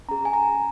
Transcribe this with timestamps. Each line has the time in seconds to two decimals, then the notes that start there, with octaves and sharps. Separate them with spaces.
0.08 C#4 A#5
0.11 G#4
0.25 G#5
0.33 A#5